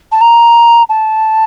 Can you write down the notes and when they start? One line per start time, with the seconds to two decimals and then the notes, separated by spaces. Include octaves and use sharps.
0.12 A5
0.21 A#5
0.89 A5